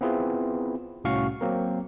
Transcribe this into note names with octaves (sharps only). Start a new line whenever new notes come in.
B3 C4 E4 F4 G#4 B4
C2 A2 C#4 F#4 F5 C#6
F#3 A#3 C4 A#4